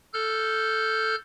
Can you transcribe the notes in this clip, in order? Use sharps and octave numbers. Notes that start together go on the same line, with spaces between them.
A4 F6 G6